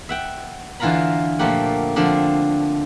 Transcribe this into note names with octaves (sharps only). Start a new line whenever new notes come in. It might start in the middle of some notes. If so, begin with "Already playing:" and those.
E5 F#5 G5
D3 E3 F4 F5 A#5 B5
A#2 F3 A3 A#3 G4 F#5
D3 F3 C4 D4